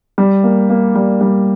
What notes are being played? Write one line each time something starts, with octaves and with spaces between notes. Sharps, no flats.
G3
A#3
A#3
G3
G3